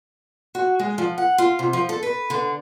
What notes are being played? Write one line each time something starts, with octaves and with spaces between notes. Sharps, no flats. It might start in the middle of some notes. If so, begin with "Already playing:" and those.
F#4
G#3
F3
F#5
F4
C3
F3
A4
B4
D3